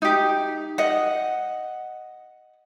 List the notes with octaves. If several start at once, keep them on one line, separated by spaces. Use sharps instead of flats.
D#4 G4
D#5 F#5